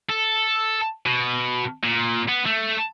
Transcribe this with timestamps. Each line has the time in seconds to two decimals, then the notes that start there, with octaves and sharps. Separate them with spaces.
0.10 A4
1.06 B2
1.83 A#2
2.28 B3
2.46 A3